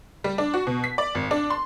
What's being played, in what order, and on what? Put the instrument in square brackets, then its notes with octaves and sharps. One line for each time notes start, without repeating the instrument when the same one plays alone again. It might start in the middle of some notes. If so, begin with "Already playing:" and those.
[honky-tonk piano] G3
D4
F#4
B2
B6
D5
G#1
D4
C6